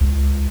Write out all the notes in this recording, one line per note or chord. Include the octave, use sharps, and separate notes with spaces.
C#2